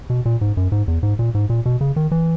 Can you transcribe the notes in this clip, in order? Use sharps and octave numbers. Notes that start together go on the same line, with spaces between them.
B2
A#2
G#2
F#2
G#2
E2
G#2
A#2
G#2
A#2
B2
C#3
D#3
E3